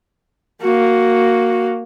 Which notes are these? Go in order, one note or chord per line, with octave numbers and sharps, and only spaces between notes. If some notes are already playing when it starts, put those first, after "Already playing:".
A#3 F#4